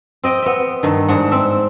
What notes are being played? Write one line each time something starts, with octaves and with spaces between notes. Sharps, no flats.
C4 D#5 G5
B3 E5
G2 D#3
G#2 D4 F#5
C4 E5